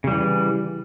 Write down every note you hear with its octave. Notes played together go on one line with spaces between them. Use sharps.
C#3 E3 G3